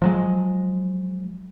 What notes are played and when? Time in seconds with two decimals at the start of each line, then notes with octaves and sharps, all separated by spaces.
0.02 F3 F#3 G#3